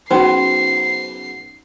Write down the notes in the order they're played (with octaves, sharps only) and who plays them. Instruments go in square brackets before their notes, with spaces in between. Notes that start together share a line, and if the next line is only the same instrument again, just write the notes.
[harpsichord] C#3 F#3 B3 [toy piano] C#4 D#4 G5 [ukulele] C5 [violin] C7